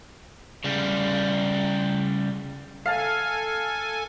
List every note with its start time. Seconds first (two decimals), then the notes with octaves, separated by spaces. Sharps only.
0.64 C#3 G3
2.86 A4 F5 G#5 A5